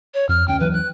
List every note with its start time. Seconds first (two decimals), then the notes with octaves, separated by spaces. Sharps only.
0.14 C#5
0.29 F2 F6
0.48 D2 C#4 G5
0.60 D#2 E3 F#3 B4
0.73 F#6